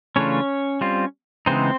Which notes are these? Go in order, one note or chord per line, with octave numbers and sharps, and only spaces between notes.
C#3 E3 A3 C#4 D4 F4 C#5
G3 C4 F4
C#3 E3 G#3 B3 C4 D#4 C5